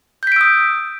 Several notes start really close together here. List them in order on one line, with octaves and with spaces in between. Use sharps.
G6 B6 D7 E6 D#6